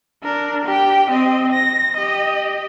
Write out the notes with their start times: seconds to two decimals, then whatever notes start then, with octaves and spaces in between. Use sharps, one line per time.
0.23 D4 A#4
0.66 G4 G5
1.10 C4 D#5
1.52 A#6
1.97 G4 D#5